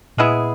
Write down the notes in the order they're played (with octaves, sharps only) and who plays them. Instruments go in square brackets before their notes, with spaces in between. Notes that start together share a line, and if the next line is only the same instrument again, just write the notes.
[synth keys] A#2 [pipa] G#3 B3 E4 G#4